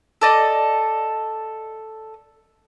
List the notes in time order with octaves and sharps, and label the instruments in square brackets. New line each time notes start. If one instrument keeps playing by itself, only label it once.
[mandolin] A4 D5 D#5